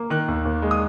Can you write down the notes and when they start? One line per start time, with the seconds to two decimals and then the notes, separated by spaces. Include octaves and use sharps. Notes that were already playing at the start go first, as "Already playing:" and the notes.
Already playing: A#3
0.10 D#3 F#6
0.28 D#2
0.45 D#2
0.62 G#3
0.71 D#6